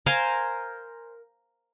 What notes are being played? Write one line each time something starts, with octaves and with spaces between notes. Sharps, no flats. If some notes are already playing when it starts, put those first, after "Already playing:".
A#4 C5 F5 G#5